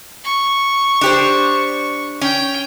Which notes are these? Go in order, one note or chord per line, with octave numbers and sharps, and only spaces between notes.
C#6
D4 G4 C5
C#4 G5